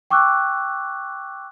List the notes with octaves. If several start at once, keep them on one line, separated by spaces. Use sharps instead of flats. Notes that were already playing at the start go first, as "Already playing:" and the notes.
G5 C#6 D6 E6 F#6